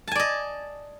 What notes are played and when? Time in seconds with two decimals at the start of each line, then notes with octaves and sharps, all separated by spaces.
0.08 A5
0.11 G#5
0.15 D5
0.19 D#5